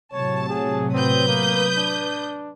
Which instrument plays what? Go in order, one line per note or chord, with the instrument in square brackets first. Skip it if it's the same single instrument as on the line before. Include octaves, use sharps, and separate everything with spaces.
[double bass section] A2 C3 F#3 [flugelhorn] C#5 [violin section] A5
[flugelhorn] G#4
[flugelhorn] C4 [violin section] B4 D#6 G6
[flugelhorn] A#3
D4